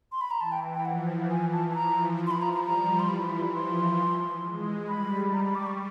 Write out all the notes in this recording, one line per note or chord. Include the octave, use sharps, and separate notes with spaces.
C6
B5
A#5
E3 A5
G5
G5
F3 F#5
E3 G#5
A5
A5
F3 A#5
C6
B5
A#5
A#5
G3 A#5
C6
E3 B5
F3 C6
G#3
G3 B5
A#5
B5
D6
C#6